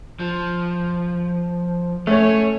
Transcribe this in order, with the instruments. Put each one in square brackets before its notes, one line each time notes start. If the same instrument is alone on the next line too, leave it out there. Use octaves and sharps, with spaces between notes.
[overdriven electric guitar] F3
[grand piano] A3 C#5 [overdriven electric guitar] C#4